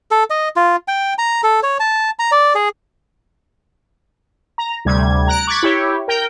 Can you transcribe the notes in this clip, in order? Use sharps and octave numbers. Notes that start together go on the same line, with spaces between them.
A4
D#5
F4
G5
A#5
A4
C#5
A5
A#5
D5
G#4
A#5
D2 C3 G3 G#6
A#5 F#6 D7
C#6 D6 F#6 G#6 A6 B6
E4 G4 C#5
A#4 G5